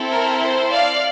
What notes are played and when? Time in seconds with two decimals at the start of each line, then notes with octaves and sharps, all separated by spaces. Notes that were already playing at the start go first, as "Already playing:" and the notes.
Already playing: C4 E4 A4
0.10 A#4
0.40 C5
0.70 D5 F5